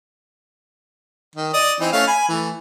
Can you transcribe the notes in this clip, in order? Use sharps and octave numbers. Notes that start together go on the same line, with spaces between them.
D#3
D5 D#5 D#6
E3 C4 D#4
A3 C#4 F5
G#5 B5
E3 A3